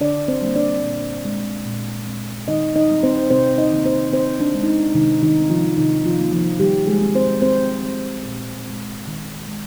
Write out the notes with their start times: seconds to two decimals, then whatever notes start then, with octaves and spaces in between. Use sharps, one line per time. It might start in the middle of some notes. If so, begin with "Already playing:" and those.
0.01 D3 D4 D5
0.28 C4 C5
0.42 G3 A#3
0.55 D4 D5
0.84 A#2
1.25 G#3 C4
1.66 A#2
2.06 G#3 C4
2.48 D#3 D#4 D#5
2.76 D#4 D#5
2.90 G3 C4
3.03 C4 C5
3.30 C3 C4 C5
3.58 D#4 D#5
3.71 D#3 A#3
3.85 C4 C5
4.13 D#3 C4 C5
4.40 D4
4.54 G#3 C4
4.63 D#4
4.68 D4
4.95 C3 D#3 D#4
5.23 D#3 D#4
5.36 G3 C4
5.50 F3 F4
5.77 C3 D#3 D#4
6.05 F3 F4
6.19 G3 A#3
6.32 F3 F4
6.60 D#3 G3 G4
6.87 G#3 G#4
7.01 G#3 C4
7.15 C4 C5
7.42 D#3 C4 C5
7.84 G3 C4
8.25 A#2
8.66 G#3 C4
9.08 D#3
9.48 G#3